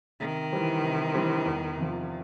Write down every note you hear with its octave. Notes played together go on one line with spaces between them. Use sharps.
C3 D#3
E3 G3 C4
C3
E3 G3 C4
E2
C3 F3